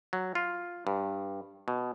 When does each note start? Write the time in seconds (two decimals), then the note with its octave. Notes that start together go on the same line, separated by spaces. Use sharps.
0.13 F#3
0.35 F4
0.87 G2
1.68 B2